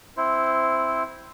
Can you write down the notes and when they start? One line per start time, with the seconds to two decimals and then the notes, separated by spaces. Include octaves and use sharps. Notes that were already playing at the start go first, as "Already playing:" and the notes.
0.17 C4 E4 C5